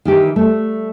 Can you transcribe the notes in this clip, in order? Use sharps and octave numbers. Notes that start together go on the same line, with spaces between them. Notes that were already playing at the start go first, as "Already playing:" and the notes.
D#3 E3 G4
G3 A3